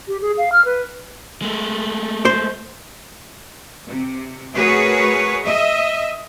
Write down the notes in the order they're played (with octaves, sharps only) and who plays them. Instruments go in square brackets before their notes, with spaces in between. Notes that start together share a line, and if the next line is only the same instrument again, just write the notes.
[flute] G4
G#4
F5
F6
B4
[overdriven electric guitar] G#3 A3
[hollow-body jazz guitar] C5
[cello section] C3
A3 F#4 G#4 A#4 B4 C#5
D#5 E5